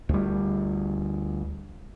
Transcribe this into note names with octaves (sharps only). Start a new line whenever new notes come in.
D2 G3